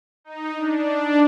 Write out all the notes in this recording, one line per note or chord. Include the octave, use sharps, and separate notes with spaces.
D#4
D4